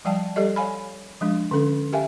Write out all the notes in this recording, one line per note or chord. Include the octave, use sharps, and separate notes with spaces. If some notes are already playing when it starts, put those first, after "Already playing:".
F3 G3 D5 F5 G5 A5
G3 G4 A4 D5 D#5
C#5 F5 G#5 B5
F3 G#3 D4
D3 C#4 A4
G4 A#4 E5 F5 G5 G#5